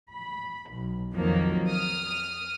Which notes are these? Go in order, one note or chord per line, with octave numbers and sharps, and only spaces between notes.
B5
B1
F2 D#3 F3 F#3 A#3
D#6 F6